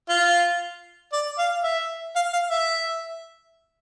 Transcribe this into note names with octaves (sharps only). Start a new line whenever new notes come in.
F4
D5
F5
E5
F5
F5
E5